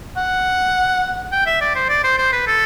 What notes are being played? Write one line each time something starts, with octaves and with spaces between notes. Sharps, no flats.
F#5
G5
E5
D5
C5
D5
C5
C5
B4
A4